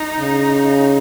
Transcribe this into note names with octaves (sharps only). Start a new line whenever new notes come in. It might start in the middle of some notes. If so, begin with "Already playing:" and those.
Already playing: D#4
C#3